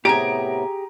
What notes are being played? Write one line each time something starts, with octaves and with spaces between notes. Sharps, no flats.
A2 C3 B3 G4 G#4 A#5 D7